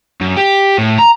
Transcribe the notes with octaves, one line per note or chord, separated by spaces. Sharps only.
F#2
G4
A2
A#5